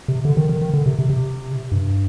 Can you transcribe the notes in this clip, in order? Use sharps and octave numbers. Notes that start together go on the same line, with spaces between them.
C3
D3
D#3
D#3
D#3
D3
C3
C3
C3
G2